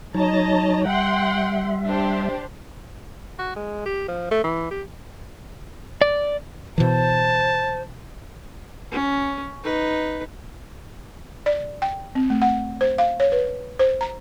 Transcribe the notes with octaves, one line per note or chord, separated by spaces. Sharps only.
F#3 D#4 C#5 D#5 A5 A#5
G3 E5 F#5 G5 C6
D4 G4 C5
F#4
G#3
G4
F3
A3
E3
G4
D5
B2 E3 C5 A5
C#4
D#4 B4
D5
G5
C4
A3
F#5
C5
F5
C#5
B4
C5
A#5